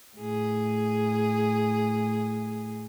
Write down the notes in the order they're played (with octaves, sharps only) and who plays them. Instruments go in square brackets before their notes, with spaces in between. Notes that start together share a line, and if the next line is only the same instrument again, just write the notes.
[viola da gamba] A2 G#4